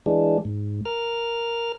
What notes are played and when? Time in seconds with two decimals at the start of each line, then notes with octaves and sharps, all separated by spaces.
0.06 E3 G#3 D4
0.45 G#2
0.85 A#4 F6